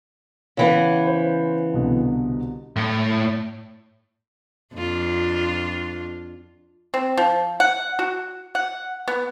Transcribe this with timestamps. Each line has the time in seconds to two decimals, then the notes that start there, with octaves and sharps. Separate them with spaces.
0.57 C#3 E3 B3
1.07 C5
1.74 C2 B2 D3
2.76 A2
4.74 F2 D4 F4
6.94 C4
7.17 F3
7.60 F#5
7.99 F#4
8.55 F#5
9.08 B3